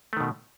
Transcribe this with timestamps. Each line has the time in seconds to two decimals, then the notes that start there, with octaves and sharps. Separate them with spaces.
0.13 A3
0.17 D#3
0.20 B2